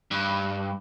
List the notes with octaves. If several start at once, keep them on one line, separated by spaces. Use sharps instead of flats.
G2